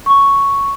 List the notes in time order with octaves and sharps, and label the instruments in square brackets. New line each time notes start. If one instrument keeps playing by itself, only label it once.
[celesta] C#6